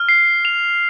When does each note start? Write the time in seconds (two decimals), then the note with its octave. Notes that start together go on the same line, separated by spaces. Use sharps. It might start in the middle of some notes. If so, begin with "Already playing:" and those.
Already playing: F6
0.09 C7
0.45 F7